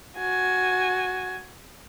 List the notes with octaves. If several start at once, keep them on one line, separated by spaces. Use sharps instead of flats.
F#4 G#5